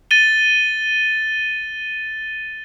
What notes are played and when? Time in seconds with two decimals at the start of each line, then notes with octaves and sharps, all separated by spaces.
0.11 A6 D#7 G7